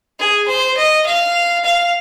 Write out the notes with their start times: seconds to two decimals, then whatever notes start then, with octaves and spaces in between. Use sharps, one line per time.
0.19 G#4
0.48 C5
0.77 D#5
1.06 F5
1.64 F5